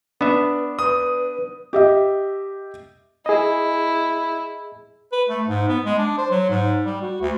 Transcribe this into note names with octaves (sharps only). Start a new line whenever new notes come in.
B3 D4 B4 E5
B4 D#6
G4 D#5 E5
E4 G#4 D#5
B4
A3
G#2
B3
G#3
D4
C5
F#3
G#2
G3
F#4
D2